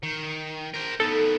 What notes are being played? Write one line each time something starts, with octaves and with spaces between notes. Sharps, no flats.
D#3
A#4 C5
D#3 B3 A4